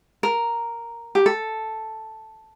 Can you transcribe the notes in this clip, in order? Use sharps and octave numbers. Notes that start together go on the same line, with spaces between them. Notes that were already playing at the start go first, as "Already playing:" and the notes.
A#4
G4
A4